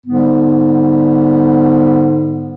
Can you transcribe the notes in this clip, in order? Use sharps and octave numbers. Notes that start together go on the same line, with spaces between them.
G#2 D3 G3 B3